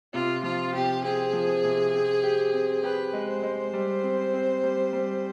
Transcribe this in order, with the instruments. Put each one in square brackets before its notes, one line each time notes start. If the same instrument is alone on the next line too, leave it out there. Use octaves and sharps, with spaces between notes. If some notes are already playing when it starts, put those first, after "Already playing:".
[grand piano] C3 [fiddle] F4
[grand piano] F3 [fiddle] F4
[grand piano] C3 [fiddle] G4
[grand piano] C4 [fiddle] G#4
[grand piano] F3
C3
C4
G4
C4
[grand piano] G4 [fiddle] B4
[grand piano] G#3
[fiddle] C5
[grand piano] G#3
G3
C4
C4
G3
G3